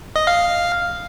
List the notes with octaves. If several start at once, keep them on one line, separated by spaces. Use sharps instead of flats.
D#5
F5